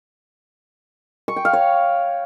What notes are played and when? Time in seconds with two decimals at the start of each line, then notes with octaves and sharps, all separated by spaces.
1.28 C#6
1.36 G5
1.45 F5
1.53 C#5